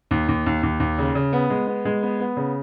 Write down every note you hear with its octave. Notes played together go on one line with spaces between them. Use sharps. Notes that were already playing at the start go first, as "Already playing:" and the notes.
D#2
D#2
D#2
D#2
D#2
C#3
C#3
B3
G#3
B3
G#3
B3
B3
C#3